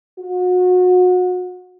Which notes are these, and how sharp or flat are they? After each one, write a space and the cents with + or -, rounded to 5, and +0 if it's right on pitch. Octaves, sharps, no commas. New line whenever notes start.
F#4 -30